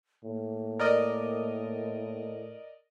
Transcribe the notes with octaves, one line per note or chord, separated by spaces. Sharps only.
A2 A#3
A#4 D5 D#5